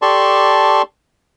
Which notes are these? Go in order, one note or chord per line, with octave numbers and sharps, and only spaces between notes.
G4 A4 D5 A5 C6 C#6